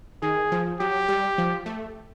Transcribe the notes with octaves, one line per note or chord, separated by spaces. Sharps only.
D#3 G#4
F3
F#3 G4
G3
F3
A3